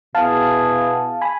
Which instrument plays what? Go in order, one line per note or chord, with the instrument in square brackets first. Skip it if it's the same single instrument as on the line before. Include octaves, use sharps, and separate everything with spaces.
[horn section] B2 B3 E4 G#4 [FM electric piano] F5 A5
[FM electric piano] G#5 B5